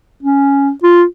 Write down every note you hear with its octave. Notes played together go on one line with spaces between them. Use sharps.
C#4
F4